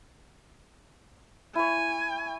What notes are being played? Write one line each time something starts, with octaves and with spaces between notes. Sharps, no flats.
E4 C#5 G#5